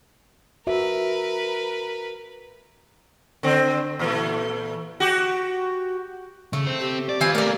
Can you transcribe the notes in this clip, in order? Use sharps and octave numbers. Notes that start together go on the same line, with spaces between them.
F#4 A#4 B4 E5
D3 C4
A#2 E3 A3
F#4 G4
C#3 A3
C4 C5
G4
D5
D#2 C4 F4 B4 G#5
A3 A#3 A#4 D5